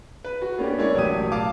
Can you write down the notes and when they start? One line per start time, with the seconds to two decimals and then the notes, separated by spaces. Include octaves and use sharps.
0.25 B4
0.42 F#4
0.58 A#3 B3 C#4 D4 G4
0.78 G#3 A#3 E4 C#5 D5
0.94 E1 A1 F#3 G4 D#6 D#7
1.32 F5 A5 D6